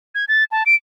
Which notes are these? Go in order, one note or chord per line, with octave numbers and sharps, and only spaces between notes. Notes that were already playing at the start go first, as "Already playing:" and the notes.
G#6
A6
A5
D7